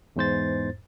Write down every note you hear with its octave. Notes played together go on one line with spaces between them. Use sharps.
E2 G#2 C5 A6